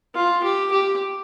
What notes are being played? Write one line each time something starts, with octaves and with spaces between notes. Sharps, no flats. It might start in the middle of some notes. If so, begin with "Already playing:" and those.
F4
G4
G4